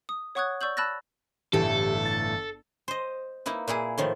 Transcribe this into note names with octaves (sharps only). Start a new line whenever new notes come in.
D#6
C#5 F#5 C#6 D#6 F#6 G#6
D5 C#6 E6 G6 F#7
A5 B5 E6 F#6 A6 A#6
G1 A2 E3 G4 A4
A6
C5 D#5
A#3 D#4 E4 B4
A#2 A#3 E4 G#4
A2 D#3 F3